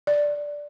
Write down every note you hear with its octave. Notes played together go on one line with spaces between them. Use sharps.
D5